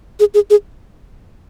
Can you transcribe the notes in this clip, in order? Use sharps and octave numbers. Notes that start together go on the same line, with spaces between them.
G#4
G#4
G#4